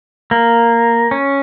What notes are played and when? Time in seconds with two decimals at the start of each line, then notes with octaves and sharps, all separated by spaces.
0.31 A#3
1.11 C#4